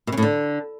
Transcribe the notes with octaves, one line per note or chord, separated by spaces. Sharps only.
B2
C#3
A2
D3